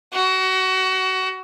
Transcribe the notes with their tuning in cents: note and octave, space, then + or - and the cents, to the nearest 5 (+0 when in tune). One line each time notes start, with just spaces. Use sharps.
F#4 +25